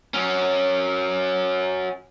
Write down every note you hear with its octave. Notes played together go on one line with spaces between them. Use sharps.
F#3 C#4